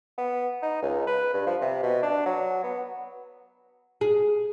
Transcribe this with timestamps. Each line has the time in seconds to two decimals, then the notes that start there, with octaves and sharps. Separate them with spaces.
0.18 B3
0.63 D#4
0.82 C#2
1.07 B4
1.34 G2
1.46 F3
1.62 C3
1.83 B2
2.02 D4
2.26 F#3
2.64 B3
4.01 G#4